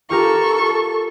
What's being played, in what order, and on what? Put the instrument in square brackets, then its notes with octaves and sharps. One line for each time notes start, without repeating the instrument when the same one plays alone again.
[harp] F4 G4 A#4 [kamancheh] A4 C#6